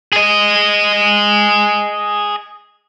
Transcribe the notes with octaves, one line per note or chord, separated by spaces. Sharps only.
G#4 D#5